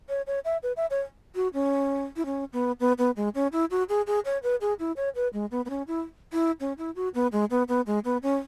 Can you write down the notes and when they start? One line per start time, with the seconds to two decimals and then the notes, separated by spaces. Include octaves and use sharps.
0.09 C#5
0.27 C#5
0.45 E5
0.63 B4
0.77 E5
0.90 C#5
1.35 F#4
1.54 C#4
2.16 E4
2.26 C#4
2.53 B3
2.80 B3
2.98 B3
3.16 G#3
3.35 C#4
3.52 E4
3.71 F#4
3.89 G#4
4.07 G#4
4.25 C#5
4.43 B4
4.61 G#4
4.79 E4
4.97 C#5
5.15 B4
5.33 G#3
5.51 B3
5.65 B3
5.70 C#4
5.88 E4
6.32 E4
6.60 C#4
6.78 E4
6.96 F#4
7.14 B3
7.32 G#3
7.50 B3
7.68 B3
7.87 G#3
8.05 B3
8.23 C#4